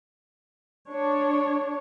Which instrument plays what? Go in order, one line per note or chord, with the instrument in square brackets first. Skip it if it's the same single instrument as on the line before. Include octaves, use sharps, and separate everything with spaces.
[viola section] D4 C#5